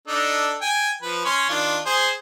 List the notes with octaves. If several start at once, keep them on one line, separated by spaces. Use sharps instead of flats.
D4 D#4 A4
G5 G#5
F3 B4
C#4 C#5 C6
D#3 D4 F4
G#4 C5